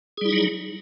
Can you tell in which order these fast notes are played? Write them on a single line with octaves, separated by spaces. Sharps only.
G#4 G3 E4 D#4 F#3